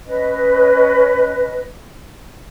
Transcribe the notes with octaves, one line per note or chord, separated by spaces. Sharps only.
C#4 B4 D#5